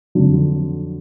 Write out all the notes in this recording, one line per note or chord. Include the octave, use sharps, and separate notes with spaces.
F2 D3 F#3